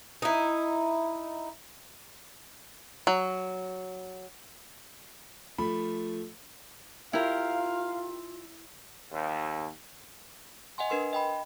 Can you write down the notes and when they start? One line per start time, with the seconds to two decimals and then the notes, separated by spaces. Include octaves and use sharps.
0.22 D#4 E4
3.07 F#3
5.58 F3 A3 B5
7.13 E4 F4 G4 A#4 F5
9.12 D#2
10.78 D#5 F#5 G#5 C6
10.90 D4 A#4 B4 C6
11.13 D#5 G5 B5